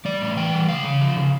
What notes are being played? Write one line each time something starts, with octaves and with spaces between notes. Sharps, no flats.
G3 D5
A2
E3 G5
G3
C#3 F5
C#3
F3
C#3